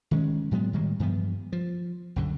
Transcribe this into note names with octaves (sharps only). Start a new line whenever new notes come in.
D#3 G#3 C#4
A2 F#3 G#3 B3
A2 D#3 G3 G#3
G2 E3 F3 B3
F3
C2 F#2 D3